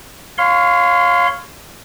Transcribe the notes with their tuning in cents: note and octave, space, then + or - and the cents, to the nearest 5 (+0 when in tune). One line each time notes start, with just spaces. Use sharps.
C#5 +0 F5 +10 C6 -30